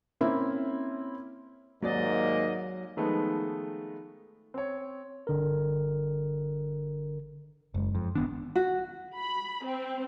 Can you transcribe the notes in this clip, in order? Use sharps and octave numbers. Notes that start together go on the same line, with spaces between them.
A#3 C4 C#4 E4 E5
D#2 G#2 F#3 A#3 D5 D#5 A6
D#3 F3 G#3 A3 B3 D#4
C4 C#5
G1 D3 A#4
F#1 F#2 G#3
F2
G#1 D#3 B3 D4
F#4
B5
C4